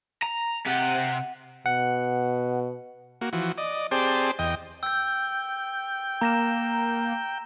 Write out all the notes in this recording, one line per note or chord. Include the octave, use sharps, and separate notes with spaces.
A#5
C3 G4 F#5
B2 F#5
A#3 F#4
E3 F3 F#4
D5 D#5
C4 G4 G#4 C5 D5 A5
E2 D#5 G5
G5 E6 G6
A#3 A#5 A#6 E7